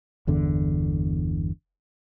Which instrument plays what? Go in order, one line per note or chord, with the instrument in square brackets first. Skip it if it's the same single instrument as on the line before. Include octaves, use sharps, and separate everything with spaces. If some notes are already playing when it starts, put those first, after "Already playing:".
[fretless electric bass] G1 E2 D3